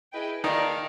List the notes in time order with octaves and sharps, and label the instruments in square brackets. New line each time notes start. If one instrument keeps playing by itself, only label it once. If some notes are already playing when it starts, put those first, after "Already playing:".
[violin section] E4 G#4 B4 D#5 G5
[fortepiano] D#3 D#4 [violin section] D4 F4 A#4 D5 F5